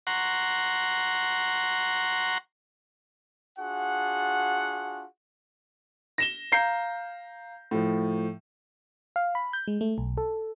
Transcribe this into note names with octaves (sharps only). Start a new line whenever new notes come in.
F#5 A#5 C6 C#6
D4 F4 F#4 G#4 F#5
A#6 E7 G7
F5 A#5 G6 C7
A2 F3
F5
B5
G6
G#3
A3
B1
A4